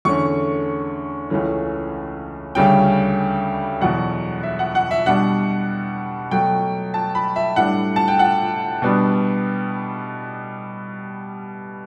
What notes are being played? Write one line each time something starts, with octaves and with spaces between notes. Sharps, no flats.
E2 D3 A3 C#4 C#6
C#2 C#3 E3 A3 C#4
D2 C#3 G3 C#4 G5
E2 B2 F#3 F#5
E5
F#5
F#5
E5
B2 G3 D4 F#5
B2 F#3 A3 G5
A5
B5
E5
A2 G3 D4 F#5
A5
G5
F#5
B2 G3 B3 D4